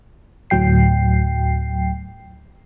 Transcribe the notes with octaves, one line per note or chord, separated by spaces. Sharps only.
D2 A2 F#3 G5 C7